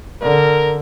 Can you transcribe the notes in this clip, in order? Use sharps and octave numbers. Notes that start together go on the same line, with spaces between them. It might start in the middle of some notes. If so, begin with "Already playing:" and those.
D3 A#4